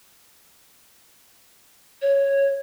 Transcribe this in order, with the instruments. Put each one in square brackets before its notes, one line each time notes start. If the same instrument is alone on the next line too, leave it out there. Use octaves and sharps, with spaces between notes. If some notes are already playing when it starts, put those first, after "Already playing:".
[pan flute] C#5